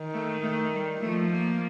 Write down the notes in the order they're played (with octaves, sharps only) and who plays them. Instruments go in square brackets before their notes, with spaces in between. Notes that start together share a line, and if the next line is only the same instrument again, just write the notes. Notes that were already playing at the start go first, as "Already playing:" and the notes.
Already playing: [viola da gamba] D#3
[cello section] A3
A3
G3
[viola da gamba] F3 [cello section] A3
[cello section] A#3